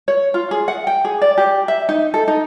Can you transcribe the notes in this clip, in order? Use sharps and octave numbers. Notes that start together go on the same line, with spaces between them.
C#5
F4
G#4
F#5
G5
G#4
D5
G4
E5
D#4
A4
D#4